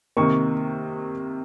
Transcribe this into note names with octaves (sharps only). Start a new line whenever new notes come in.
C3 D#3 A#3 C#6